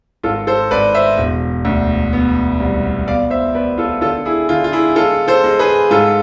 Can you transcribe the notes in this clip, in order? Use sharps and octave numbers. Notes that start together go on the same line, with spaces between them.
G#1 F4 A4
A4 C5
G#1 B4 D5
C5 E5
E1
D2
B3
C2
B3 D5 F5
C5 E5
B3 B4 D5
F4 A4
D3 F4 A4
E4 G#4
D3 F4
F4
E4 G#4
G#3 F4 A4
A4 C5
G#3
G#4 B4
G#2 F4 A4